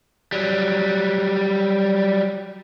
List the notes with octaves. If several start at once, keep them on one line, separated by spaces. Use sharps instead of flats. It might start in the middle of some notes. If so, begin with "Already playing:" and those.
F#3 G3